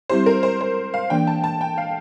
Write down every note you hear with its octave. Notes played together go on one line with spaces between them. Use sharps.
G3 C4 E4 G4 C5
A#4
C5
C5
F5
E3 A#3 D4 G5
A5
A5
G5
F5